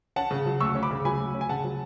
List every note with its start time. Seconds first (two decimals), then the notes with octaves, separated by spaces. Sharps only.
0.16 C#4 F#5 A5
0.31 C#3
0.46 F#3
0.60 D2 C#6 E6
0.75 C#4
0.83 B5 D6
0.90 C#3
1.05 F#3 G#5 B5
1.20 D2
1.35 C#4
1.41 G#5
1.49 C#3 F#5 A5
1.64 F#3